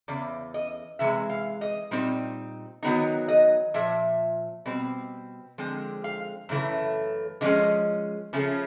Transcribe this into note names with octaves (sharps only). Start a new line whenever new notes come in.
E2 C#3 D5
D#5
C3 E3 G#3 E5
F5
D#5
A#2 G3 C4 D#4
D#3 F#3 B3 D#4
D#5
A#2 F3 E5
B2 G3 C4
D3 F3 G#3 C4
F5
F#2 C#3 E3 A3
D3 F3 G#3 C#4 D#5
C#3 F3 A3 C#4